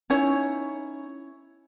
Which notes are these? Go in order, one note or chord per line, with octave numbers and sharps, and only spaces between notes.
C#4 D#4 E4 C#5